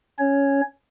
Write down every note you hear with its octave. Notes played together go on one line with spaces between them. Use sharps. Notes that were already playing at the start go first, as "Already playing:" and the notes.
C#4 C#5